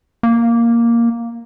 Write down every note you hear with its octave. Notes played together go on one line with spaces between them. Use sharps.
A#3